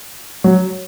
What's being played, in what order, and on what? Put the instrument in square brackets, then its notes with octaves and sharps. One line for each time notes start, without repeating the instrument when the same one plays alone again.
[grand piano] F#3